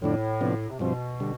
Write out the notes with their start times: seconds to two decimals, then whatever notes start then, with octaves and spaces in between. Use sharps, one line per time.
0.02 F2 A2 D3 A3 D4
0.41 C3 F3 B3 D4
0.69 C3
0.79 G2 B2 F3 C4
1.20 D3 G3